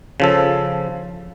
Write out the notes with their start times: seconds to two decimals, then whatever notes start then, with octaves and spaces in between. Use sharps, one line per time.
0.20 C#3 F3 A4